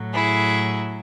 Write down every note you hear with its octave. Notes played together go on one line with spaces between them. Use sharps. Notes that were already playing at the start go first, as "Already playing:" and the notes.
Already playing: A2 F#3
E4 G#4